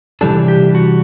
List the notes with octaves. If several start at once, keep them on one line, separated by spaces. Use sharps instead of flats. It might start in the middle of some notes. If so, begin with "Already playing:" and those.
C3 E3 G3 D4 A4
G4
F#4